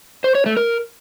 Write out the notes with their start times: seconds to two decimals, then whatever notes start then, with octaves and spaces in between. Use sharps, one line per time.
0.24 C5
0.35 C#5
0.46 A3
0.57 A#4